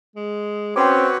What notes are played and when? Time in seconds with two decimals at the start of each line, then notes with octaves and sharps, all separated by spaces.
0.16 G#3
0.76 C4 C#4 F#4 B4 C#5 G5 C6 D6